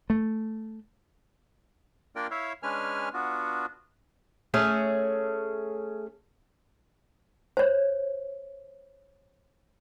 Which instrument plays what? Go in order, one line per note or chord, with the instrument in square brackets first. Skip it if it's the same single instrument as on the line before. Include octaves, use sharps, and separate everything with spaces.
[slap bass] A3
[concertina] A#3 D4 F4 A#4 D5 G5
E4 C#5 E5 F5
G#3 C#4 D4 B4 G#5 F6
B3 D4 F4 F#4
[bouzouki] A3 C#4 G#4 E5
[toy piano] C5 C#5